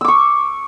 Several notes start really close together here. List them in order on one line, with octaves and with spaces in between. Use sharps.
E6 D6 C#6